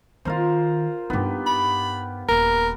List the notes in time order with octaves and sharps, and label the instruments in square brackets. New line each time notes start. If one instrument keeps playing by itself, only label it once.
[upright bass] D#3 C4 [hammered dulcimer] F4 A#4 C5
[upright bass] G2 D#4 [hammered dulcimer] B3 G4
[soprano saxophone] B5
[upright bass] D#1 [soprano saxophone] A#4